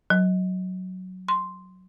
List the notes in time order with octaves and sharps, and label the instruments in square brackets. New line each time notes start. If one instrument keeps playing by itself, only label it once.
[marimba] F#3
C6